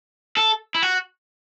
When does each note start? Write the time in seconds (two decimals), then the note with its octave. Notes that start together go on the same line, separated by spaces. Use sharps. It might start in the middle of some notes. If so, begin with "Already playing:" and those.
0.37 A4
0.75 E4
0.82 F#4